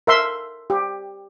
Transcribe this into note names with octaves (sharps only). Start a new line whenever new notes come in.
A#4 E5 C6
G4